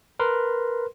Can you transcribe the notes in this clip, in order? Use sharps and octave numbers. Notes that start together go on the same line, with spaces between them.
A#4 B4 C6